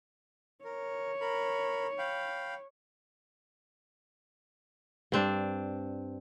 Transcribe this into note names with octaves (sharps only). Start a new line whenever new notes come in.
A#4 C#5
A#4 B5
F5 G5 B5
G2 C4 D4